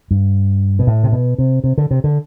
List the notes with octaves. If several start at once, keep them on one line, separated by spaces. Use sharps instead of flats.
G2
B2
A2
C3
B2
C3
C3
D3
C3
D3